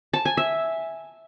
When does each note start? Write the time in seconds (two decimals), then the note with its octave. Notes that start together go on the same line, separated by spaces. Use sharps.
0.13 A5
0.25 G#5
0.37 E5